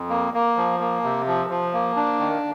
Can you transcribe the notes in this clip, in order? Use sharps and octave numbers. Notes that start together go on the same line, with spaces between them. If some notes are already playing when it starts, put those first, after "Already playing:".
Already playing: F2
A#3
A#3
F3
A#3
C3
F3
F3
A#3
D4
D#3